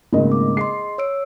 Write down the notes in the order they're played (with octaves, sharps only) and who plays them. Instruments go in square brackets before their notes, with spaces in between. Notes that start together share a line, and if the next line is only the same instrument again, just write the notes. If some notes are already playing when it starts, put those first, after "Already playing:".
[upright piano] G#1 C#3 D#5 [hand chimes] A3 A#3 A#4
[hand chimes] D6
[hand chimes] G#4 D#5 C6 [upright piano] C7
[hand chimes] C#5 E6 D7